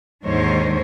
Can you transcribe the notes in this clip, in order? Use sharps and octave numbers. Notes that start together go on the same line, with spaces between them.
D#2 G#2 D3 D#3 C5 C#5